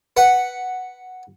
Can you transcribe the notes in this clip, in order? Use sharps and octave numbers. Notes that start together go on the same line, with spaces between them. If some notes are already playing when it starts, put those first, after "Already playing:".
B4 F#5